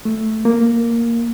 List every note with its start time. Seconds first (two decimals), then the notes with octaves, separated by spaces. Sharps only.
0.05 A3
0.45 A#3